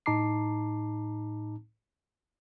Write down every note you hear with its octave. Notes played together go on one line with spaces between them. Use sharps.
A2 D#4 A5 A#5 D6 C7